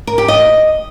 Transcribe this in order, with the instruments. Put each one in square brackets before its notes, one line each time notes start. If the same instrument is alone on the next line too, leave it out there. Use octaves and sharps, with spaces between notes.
[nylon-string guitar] A#4
G4
D#5